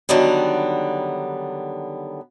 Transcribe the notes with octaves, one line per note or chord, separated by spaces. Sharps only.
D3 D#3 F#3 G3 B3